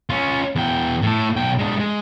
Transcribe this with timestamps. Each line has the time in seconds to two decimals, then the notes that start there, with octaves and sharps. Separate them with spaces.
0.10 C#4 F4
0.56 E2 G5
1.03 A2 A4
1.36 B1 G5
1.59 G#3 D4
1.79 G#3